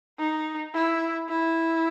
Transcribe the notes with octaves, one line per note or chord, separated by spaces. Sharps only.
D#4
E4
E4